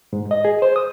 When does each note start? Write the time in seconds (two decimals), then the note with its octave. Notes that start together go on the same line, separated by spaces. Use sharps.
0.13 G#2
0.31 D#5
0.45 G#4
0.62 C5
0.76 D#6